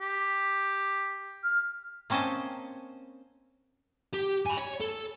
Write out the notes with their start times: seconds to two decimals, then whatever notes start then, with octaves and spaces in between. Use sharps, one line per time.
0.01 G4
1.44 F6
2.10 A#3 C4 C#4 C5 D#5 A5
4.13 G4
4.46 G#5 B5
4.57 C#5
4.81 A4